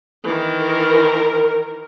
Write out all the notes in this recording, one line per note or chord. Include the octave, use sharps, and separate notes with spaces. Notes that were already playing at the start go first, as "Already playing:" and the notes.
D#3 E3
A#4